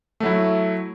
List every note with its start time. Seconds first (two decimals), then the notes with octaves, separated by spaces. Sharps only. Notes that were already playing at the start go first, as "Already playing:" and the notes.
0.20 A3
0.23 F#3
0.26 E4